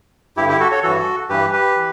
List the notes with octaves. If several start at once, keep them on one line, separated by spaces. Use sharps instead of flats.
G2 D3 E4 G4
E4 G4
F#4 A4
A4 C#5
G2 E3 F#4 A4
G2 E3 G4 B4
G4 B4
E3